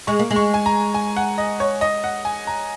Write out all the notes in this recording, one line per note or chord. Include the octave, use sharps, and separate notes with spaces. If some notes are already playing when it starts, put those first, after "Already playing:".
G#3 C#6
A#3
G#3
C#6
G#5
A#5
G#5
F#5
D#5
C#5
D#5
F#5
G#5
A#5